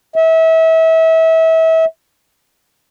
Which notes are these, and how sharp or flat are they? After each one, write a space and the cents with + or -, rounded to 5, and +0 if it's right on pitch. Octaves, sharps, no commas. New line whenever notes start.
E5 -30